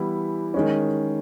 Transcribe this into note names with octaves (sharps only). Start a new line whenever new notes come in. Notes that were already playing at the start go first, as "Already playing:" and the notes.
Already playing: E3 G3 B3 E4
D#3 G#3 C#4